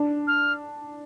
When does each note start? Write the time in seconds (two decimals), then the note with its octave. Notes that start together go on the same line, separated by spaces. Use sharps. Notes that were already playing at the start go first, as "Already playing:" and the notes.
Already playing: D4
0.27 F6